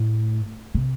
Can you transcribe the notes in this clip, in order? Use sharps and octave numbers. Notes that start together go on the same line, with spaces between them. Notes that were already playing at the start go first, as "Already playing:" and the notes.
Already playing: A2
C3